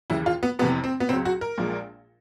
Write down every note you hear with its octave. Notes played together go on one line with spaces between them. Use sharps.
D#2 C#3 E3 E4
F4
B3
F1 F2 C3 E3 B3
C4
B3
C#2 C#3 F#3 C4
F#4
A#4
A#1 A#2 F3 G#3